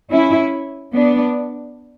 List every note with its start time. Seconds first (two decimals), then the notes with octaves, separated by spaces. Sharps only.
0.11 C#4 E4
0.94 B3 D4